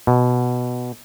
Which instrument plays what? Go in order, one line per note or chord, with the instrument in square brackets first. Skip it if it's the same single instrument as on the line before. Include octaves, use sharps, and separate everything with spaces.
[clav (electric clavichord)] B2